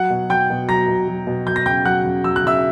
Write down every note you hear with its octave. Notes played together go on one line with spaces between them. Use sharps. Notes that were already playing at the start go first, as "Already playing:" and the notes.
Already playing: F#3 F#5 F#6
B2
F#3 G5 G6
B2
F#3 A#5 A#6
B2
F#3
B2
F#3 G6
A#6
C#3 G5 G6
F#3 F#5 F#6
C#3
F#3 E6
F#6
C#3 E5 E6